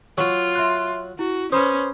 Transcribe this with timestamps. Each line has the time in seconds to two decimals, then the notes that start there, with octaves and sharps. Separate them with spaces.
0.18 F#3 F4 C#6
0.55 E5 C6 F#6
1.19 E4 F#4
1.52 C#4 B4 C5 B5 D#6